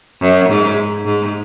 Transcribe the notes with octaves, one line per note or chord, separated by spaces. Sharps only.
F#2
G#2
G#2